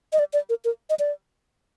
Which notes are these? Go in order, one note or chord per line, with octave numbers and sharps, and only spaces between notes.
D#5
D5
D5
A#4
A#4
D#5
D5